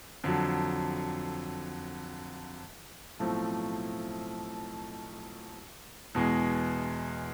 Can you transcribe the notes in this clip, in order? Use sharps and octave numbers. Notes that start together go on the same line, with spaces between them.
F2 D3 F#3
B1 A2 F3 A3 C4
E2 B2 G#3